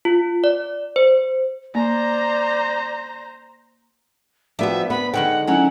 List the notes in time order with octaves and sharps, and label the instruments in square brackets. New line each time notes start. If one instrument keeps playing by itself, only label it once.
[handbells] F4
D5
C5
[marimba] A#3 [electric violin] C5 A#5 [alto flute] D5
[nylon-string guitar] F3 B3 F#4 [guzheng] C4 D4 [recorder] E5
[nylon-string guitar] B3 [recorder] B5
[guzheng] D3 D#3 G#3 [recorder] F#5 [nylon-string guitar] G5
[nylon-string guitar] F#3 C#4 E4 [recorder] F#5